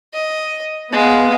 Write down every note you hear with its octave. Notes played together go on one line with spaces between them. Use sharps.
D#5
G#3 B3 F5